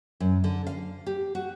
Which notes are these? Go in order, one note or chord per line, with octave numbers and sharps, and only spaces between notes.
F#2
D3
F5
G4
F#4